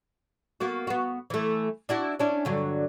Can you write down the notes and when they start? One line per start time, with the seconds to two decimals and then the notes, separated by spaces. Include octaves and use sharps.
0.60 A#3 B3 F#4
0.87 B3 F#4
1.30 E3 A3
1.89 D4 E4 F#4
2.19 C#4 D4 E4
2.45 G2 D3 F#3